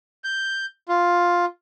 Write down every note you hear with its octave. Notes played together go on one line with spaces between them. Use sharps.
G6
F4